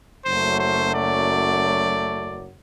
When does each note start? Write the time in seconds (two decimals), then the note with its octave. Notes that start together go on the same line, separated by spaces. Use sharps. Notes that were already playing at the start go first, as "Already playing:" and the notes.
0.24 F#1 F#2 F#3 A3 C5
0.60 C5
0.95 D5